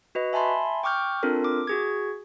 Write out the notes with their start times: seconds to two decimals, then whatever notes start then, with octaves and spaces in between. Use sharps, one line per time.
0.15 F#4 B4 D#5
0.33 E5 G#5 A5 B5 C6
0.83 G5 C#6 D6 F6 G6
1.23 C4 D4 F4 A4 A#4
1.44 D6
1.67 F#4 G#4 G#6